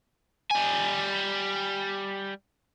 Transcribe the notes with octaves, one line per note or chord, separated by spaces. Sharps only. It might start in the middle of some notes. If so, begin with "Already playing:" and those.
G3 G#5